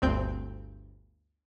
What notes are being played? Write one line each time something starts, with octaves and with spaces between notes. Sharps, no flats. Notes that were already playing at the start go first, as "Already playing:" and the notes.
G1 D2 C4 G6